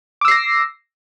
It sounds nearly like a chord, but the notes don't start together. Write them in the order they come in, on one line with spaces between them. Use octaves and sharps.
D6 E6 C7 A#6